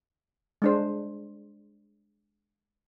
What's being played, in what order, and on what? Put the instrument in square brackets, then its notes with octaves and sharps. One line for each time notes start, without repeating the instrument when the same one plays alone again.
[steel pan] G#3 D4 C5